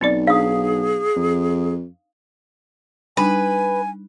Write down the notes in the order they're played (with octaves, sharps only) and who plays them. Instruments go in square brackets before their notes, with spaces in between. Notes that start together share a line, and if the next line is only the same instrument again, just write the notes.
[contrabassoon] B1 [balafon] C4 D#4 D5
[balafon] D4 [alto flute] G#4 [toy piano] F5 D#6
[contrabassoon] F2
[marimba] G3 D4 D#4 [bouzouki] B4 [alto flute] G#5